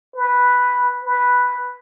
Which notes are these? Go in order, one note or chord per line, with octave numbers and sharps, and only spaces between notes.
B4
B4